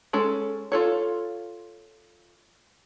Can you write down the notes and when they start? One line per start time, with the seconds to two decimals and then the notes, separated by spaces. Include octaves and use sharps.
0.13 G#3 C#4 A4
0.72 F4 A4 C#5